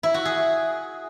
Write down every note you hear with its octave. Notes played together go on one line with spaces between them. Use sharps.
E4
F#4
G#4